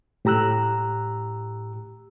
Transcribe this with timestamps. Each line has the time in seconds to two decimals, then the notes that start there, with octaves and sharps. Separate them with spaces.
0.25 A2 G4 A#5 E6 F#6